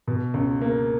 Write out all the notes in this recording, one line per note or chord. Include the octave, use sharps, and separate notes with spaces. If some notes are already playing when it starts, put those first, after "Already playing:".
B2
C#2
A#3